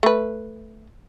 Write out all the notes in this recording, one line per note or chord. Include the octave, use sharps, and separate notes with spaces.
A3 B4